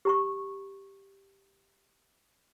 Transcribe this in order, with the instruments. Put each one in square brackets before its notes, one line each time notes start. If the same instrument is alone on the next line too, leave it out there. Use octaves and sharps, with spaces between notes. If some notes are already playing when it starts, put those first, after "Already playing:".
[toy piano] G4 A#5 C#6